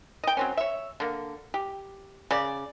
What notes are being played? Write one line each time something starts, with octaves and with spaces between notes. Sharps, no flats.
D#5 G5
F#3 C4 C#4
C#5 E5
D3 A#3
G4
C#3 D5